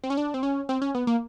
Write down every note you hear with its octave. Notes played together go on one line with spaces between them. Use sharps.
C4
C#4
D4
C4
C#4
C4
C#4
B3
A#3